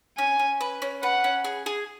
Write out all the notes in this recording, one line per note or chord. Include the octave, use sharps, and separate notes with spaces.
C#4 G#5
C#4
B4
C#4
B4 F#5
C#4
G#4
G#4